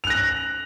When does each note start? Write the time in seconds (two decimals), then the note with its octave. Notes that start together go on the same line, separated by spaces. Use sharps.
0.04 F7
0.07 F#6
0.10 A#6